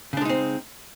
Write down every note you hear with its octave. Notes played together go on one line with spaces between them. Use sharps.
C#3 G#3 C4 D4 D#4